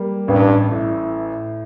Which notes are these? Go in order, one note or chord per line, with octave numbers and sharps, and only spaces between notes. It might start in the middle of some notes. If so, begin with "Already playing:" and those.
Already playing: G3 A#3
A1 G2
A2